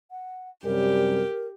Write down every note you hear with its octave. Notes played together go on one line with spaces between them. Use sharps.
F#5
F#2 C3 G3 G4 A#4